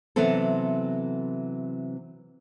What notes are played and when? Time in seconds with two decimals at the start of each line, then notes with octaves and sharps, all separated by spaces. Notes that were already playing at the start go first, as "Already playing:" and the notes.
0.16 C3 E3 F#3 B3 C4 A4